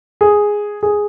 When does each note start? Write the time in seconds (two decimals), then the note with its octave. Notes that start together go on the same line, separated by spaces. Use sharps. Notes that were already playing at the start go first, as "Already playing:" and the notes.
0.21 G#4
0.83 G#4